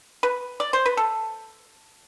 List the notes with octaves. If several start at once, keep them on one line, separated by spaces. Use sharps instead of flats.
B4
D5
C5
B4
A4